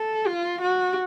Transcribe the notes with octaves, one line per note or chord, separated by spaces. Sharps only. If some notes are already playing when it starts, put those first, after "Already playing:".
Already playing: A4
F4
F#4